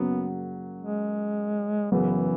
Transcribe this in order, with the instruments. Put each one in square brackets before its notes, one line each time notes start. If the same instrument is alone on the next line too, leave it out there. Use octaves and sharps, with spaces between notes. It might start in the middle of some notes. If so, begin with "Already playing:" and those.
Already playing: [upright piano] F#2 C#3 F#3 A#3 [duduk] B3
[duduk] G#3
[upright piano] F#2 C#3 F#3 B3 [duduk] E3